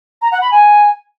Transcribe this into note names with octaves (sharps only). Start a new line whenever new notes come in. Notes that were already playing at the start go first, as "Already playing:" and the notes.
A#5
F#5
B5
G#5